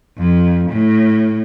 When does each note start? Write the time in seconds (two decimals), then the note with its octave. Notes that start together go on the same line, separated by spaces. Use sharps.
0.17 F2
0.70 A2